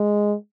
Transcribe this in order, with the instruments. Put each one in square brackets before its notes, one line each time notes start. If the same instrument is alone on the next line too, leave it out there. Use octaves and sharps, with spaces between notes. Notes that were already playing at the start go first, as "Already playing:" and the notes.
Already playing: [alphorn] G#3